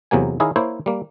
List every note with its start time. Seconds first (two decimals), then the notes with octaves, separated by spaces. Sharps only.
0.11 E2 C3 F#3 A#3 G#5
0.40 D#3 E4 G#4 A#4 C#5 F5
0.56 A#3 E4 C5 C#5
0.86 G3 A#3